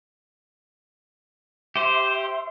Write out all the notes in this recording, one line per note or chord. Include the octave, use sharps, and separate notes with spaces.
G4 C5 E5 C6